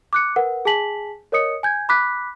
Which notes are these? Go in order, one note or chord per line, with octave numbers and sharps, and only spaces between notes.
D6 F#6 C#7
A#4 B4 F#5
G#4 G#5 A5 B6 F#7
A#4 C#5 D#5 D#6 C#7
G#5 G6 G#6
B5 D6 F#6 B6